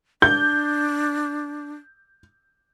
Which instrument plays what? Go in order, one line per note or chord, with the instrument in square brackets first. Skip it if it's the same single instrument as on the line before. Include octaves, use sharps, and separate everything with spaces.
[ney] D4 [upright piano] G6